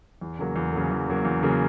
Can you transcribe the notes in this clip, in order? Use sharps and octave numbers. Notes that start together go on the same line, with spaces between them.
E2
C#3 F#3 A#3
E2
C#3 F#3 A#3
E2
C#3 F#3 A#3
E2
C#3 F#3 A#3